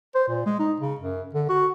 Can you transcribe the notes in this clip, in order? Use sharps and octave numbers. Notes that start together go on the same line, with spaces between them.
C5
A#2
G#3
D#4
C#3
F#2
D3
F#4